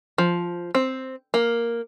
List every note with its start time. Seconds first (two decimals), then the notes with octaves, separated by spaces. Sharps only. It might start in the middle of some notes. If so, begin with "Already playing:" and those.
0.18 F3
0.75 C4
1.34 A#3